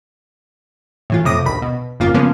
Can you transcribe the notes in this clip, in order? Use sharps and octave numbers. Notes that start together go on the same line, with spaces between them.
A2 E3 F4
F2 A2 C3 D6 D#6 A#6
A#1 D#2 B5
B2
G#1 F#2 C#3 A#3 F4
C#3 F3 G#3 A#3 B3 C#4